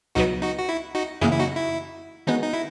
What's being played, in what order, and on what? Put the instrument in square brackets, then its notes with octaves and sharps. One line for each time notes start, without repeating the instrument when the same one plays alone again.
[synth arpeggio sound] C#2 B2 F#3 B3 [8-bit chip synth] D#4 F#4
[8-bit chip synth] D#4 F#4
F#4
E4
D#4 F#4
[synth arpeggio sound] F#2 C#3 E3 A#3 [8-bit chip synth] E4 G#4
[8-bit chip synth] E4
D#4 F#4
E4
[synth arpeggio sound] D#3 G#3 B3 F#4 [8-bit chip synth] D#4
[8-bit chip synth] D#4
E4